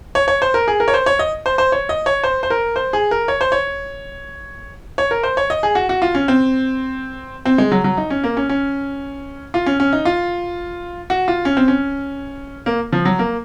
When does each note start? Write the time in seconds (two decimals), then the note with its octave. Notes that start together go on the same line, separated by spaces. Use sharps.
0.15 C#5
0.28 C#5
0.42 C5
0.54 A#4
0.68 G#4
0.80 A#4
0.88 C#5
0.94 C5
1.06 C#5
1.19 D#5
1.46 C5
1.58 C5
1.72 C#5
1.89 D#5
2.06 C#5
2.24 C5
2.43 C5
2.50 A#4
2.76 C5
2.93 G#4
3.11 A#4
3.28 C#5
3.41 C5
3.52 C#5
4.98 C#5
5.11 A#4
5.23 C5
5.37 C#5
5.50 D#5
5.63 G#4
5.75 F#4
5.89 F#4
6.02 F4
6.15 C#4
6.28 C4
7.45 C4
7.58 G#3
7.72 F#3
7.84 F#3
7.98 D#4
8.10 C#4
8.24 A#3
8.37 C#4
8.49 C#4
9.54 F4
9.66 C#4
9.80 C#4
9.93 D#4
10.05 F4
11.10 F#4
11.28 F4
11.45 C#4
11.57 C4
11.68 C#4
12.66 A#3
12.93 F3
13.05 F#3
13.19 A#3